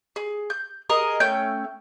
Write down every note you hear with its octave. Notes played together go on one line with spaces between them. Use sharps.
G#4
G6
G#4 A#4 D#5 D#6
A3 C#4 G5 G6